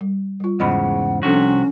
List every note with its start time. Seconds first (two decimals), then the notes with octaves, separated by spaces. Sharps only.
0.01 G3
0.40 G3 F4
0.60 E2 G#2 C#3 D#5 F#5 B5
1.23 C2 C3 F3 C#4 D4 F#4 A4